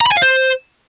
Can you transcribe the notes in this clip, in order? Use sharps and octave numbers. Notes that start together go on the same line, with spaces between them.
A#5
B5
G#5
F5
C5